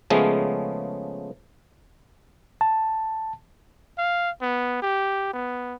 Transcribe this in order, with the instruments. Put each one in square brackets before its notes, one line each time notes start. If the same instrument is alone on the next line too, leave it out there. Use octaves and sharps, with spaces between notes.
[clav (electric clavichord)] C#3 F3 G#3 A3 B3 C#4
[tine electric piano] A5
[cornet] F5
B3
G4
B3